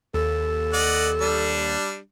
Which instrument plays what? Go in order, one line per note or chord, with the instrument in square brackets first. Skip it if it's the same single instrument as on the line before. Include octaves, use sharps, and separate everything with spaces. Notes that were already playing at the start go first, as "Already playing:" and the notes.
[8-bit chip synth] D#2 [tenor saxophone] A4
[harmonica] D5 D#5 F#5
G3 D4